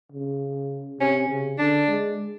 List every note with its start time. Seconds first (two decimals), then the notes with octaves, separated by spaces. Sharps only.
0.12 C#3
1.00 C3 C#4
1.29 C#3
1.58 D3 D4
1.88 G#3